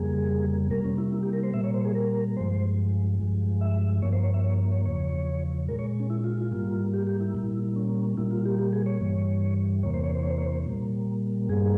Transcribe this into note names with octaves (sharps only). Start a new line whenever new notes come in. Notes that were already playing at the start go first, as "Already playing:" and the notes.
Already playing: F2 C#3 G3 A#3 G#4
C3 G3 A#3 A#4
C#4
E4
E4
G4
A#4
C5
A#2 G3 A#3 E5
C#5
C5
G#4
A#4
G2 F3 G#3 C5
G2 F3 G#3
E5
G2 F3 A#3 C#5
C5
C#5
E5
C#5
C#5
E2 C#3 F3 C#5
A#2 G#3 A#4
C#5
C#4
E4
F4
F4
G#2 G3 A#3
G4
G4
E4
A#2 G3 A#3
C#4
A#2 G3 A#3 E4
F4
G4
G4
G#4
C#5
G2 E3 G3
E2 C3 E3 A#3 C#5
C5
C#5
C5
C#5
C5
C#5
C5
A#2 G3 A#3
G2 G3 A#3 G#4